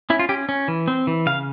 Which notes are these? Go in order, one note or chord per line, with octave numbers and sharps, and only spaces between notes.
C#4 E4
F4
C#4 G4
C#4
E3
C4
E3
C#3 F5